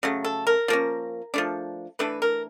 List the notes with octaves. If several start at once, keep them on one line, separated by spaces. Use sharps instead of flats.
C#3 F#3 A3
A4
A#4
F3 A#3 C#4
F3 A3 D4
E3 A3 D4 B4
A#4